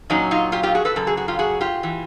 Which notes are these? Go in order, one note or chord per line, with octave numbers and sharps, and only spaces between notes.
A#2 F#3 C#4 D#4
D#4 F4
F4 G4
F4 G4
F#4 G#4
A4 B4
F#2 C#3 A4
F#4 G#4
F#4 G#4
F4 G4
F#4 G#4
F4 G4
E3